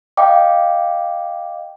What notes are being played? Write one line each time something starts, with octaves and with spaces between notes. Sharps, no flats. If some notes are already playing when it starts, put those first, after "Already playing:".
D#5 F5 G5 D6